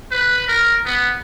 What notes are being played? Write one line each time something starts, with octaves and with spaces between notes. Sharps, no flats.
B4
A#4
B3